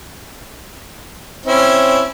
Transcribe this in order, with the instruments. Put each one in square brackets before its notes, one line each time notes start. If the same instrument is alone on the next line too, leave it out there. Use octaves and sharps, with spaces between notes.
[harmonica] C4 C#4 E4